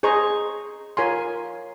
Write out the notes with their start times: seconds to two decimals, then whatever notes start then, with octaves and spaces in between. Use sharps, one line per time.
0.03 G#4 C5 D#5 A#5 C#6
0.97 F4 A#4 C#5 G#5 C6